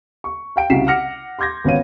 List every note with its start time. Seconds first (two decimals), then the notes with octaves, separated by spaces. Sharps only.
0.24 C#6
0.56 F5 G5 D7
0.70 C2 C#3 F#4 B6 C7 E7
0.87 F#5 D6 F6 A#6 C#7
1.39 C6 D6 G6 G#6 A#6
1.64 G#1 B3 C#4 C#5 F5 D#7